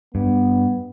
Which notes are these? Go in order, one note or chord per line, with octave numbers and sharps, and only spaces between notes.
G2 B3